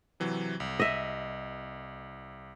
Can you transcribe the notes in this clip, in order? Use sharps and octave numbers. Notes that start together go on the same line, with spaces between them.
C3 E3 F#3
C2
D#5 E5